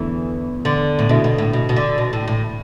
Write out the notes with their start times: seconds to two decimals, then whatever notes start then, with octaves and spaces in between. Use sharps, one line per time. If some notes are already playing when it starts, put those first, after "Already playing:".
Already playing: E2 D3 E3 A3
0.65 D3
0.99 A2
1.09 B2 D3 A3 E4 A4 E5
1.24 B2
1.38 A2
1.53 B2
1.69 B2
1.76 D3
1.98 B2
2.13 A2
2.28 A2